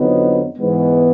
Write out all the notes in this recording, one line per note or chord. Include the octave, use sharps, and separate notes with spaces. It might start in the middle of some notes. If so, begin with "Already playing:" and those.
Already playing: F2 D3 F#3 B3 D#4
G#2 E3 G#3 B3